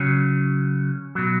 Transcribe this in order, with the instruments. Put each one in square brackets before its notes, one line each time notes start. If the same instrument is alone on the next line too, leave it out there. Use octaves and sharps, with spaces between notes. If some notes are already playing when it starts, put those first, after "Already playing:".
Already playing: [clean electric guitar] C#3 F#3 C#4
B2 F#3